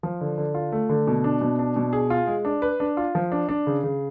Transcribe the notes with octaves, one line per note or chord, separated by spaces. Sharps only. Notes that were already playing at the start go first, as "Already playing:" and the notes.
F3
D3
D3
F4
A3
D3
B2
D4
B2
D4
B2
G#4
F4
G#3
D4
B4
D4
F4
F3
D4
D4
C#3
C#3